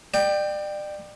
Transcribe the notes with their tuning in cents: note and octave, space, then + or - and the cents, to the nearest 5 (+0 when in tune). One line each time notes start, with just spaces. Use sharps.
D5 +35 G5 +0